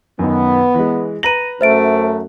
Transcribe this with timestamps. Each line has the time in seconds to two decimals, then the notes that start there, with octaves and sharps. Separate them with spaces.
0.19 F#2 D#3 B3
0.74 E3 G#3
1.23 B4 A#5 A#6 D#7 F#7
1.61 F#2 A3 C5 E5 D7